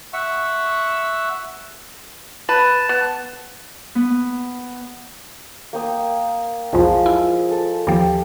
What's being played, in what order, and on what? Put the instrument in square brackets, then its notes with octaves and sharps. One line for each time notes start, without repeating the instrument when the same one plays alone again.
[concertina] E5 F#5 C#6 E6
[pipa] B4 [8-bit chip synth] A5
[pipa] B3
[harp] B3
[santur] A#3 G5 D#6
[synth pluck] B1 E2 [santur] F3 G#3
[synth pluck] E4
[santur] A4
[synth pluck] D#2 F3 [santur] G4 E6